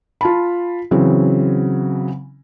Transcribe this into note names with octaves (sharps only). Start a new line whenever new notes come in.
F4 A5 B5
C#3 E3 F#3 C4